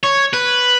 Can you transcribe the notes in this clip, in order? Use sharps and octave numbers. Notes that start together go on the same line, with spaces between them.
C#5
B4